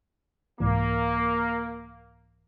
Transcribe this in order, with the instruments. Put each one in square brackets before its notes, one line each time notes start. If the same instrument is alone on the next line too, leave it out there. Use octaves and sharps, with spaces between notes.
[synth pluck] C2 G#2 E3 [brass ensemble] A#3